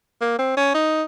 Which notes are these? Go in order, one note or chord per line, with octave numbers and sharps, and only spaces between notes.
A#3
C4
C#4
D#4